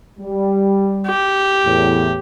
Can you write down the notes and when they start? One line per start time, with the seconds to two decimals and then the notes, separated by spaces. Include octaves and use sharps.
0.19 G3
1.06 G4
1.65 E2 A2